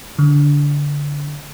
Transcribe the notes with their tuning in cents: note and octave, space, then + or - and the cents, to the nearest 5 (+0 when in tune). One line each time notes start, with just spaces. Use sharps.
D3 -20